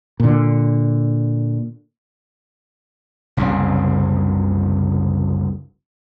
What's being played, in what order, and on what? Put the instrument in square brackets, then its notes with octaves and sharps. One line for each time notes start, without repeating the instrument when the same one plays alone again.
[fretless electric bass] A#2 D3
[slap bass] F#1 C2 F#2 C#3